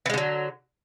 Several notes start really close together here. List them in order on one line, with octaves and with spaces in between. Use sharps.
E3 G#3 D3 F#3